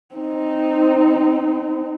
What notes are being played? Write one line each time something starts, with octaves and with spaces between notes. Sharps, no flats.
C4 D#4